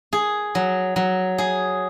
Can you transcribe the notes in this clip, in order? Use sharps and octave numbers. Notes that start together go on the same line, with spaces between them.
G#4
F#3
F#3
G#4